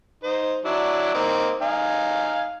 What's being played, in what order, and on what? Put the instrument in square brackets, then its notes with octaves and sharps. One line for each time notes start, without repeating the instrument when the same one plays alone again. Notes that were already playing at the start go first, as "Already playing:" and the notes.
[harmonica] D#4 C5
F#3 D4 E4
A#3 C4 D#4
D#4 F5 G#5